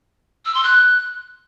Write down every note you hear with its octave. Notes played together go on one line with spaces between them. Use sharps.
E6
C6
F#6